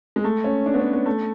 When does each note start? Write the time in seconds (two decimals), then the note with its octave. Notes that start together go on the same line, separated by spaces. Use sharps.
0.16 G#3
0.24 A3
0.44 C#4
0.66 D4
0.74 B3
0.80 C#4
0.93 B3
1.06 A3